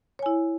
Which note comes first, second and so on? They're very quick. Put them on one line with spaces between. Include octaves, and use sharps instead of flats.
C#5 G#5 E4